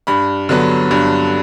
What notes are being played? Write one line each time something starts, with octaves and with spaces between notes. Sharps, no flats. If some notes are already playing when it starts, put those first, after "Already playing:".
G2 B5
D3 F#3 B3
G2